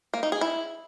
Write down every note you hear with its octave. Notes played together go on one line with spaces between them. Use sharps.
A#3
D#4
G#4
E4